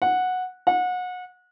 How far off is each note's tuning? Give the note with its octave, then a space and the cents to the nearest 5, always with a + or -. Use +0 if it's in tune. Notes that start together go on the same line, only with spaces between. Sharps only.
F#5 -10
F#5 -30